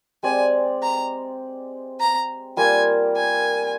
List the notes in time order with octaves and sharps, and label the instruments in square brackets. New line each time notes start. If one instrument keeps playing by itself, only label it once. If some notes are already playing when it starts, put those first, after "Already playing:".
[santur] G#3 C4 G4 D5 [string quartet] G#5
[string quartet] A#5
A#5
[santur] G3 A#3 F4 A#4 [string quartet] G#5
[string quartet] G#5